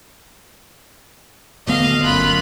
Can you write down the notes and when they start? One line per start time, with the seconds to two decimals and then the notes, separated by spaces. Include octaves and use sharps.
1.67 D1 D2 B3 D#5 F5
2.02 F#1 F#2 F4 B5 F#6